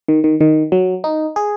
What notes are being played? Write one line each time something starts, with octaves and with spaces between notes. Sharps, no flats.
D#3
D#3
D#3
F#3
D#4
G#4